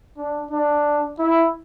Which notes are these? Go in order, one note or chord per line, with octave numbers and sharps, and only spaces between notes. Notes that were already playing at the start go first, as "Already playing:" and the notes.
D4
D4
E4